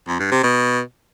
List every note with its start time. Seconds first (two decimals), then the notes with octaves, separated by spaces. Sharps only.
0.08 F2
0.20 G2
0.31 C3
0.43 B2